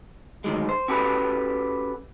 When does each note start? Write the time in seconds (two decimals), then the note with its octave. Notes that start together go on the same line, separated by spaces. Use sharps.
0.44 D2 G2 D#3 F#3 G#3
0.69 C5
0.88 C#4 F#4 G4 A4 B4